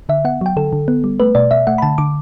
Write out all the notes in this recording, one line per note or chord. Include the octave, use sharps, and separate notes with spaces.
D3 E5
B3 F#5
F#3 G5
D3 A4
D3
B3
G3
A3 B4
B2 D5
B2 E5
A3 F#5
B5
D3 A5
D3 D6